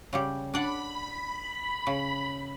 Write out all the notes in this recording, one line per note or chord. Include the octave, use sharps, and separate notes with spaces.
C#3 G3 G4
D4 D5 F#5 B5
C#3